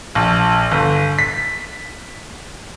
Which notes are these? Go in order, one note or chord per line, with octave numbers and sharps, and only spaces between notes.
A#1
G1
B6